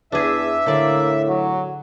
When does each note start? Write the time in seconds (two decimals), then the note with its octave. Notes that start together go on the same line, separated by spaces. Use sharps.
0.12 E2 D4 G#4 E5
0.66 A2 D3 A#3 D5
1.29 F#3